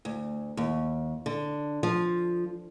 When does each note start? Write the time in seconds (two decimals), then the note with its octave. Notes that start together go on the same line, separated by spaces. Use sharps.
0.05 D2
0.57 D#2
1.26 D3
1.83 F3